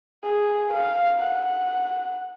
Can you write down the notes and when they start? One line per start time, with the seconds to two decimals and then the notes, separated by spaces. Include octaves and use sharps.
0.24 G#4
0.74 F5
1.22 F#5